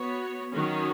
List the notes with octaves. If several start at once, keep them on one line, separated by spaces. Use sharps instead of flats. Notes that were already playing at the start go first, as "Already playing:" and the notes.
Already playing: B3 F#4 C#5
D#3 F#3 C#4 F#4